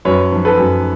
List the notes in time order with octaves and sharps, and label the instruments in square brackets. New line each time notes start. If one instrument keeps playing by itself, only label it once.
[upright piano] F#2 B4 C#5
F3
A4 B4
F#2